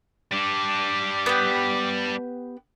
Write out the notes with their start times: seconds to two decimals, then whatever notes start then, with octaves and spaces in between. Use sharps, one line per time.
0.33 G3 D4 D6
1.26 B3 G4